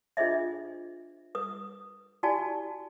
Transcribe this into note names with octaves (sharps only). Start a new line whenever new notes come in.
D4 F4 G#4 C5 D#5 E5
B4 D#6
E4 F#4 G4 D5 G#5 A5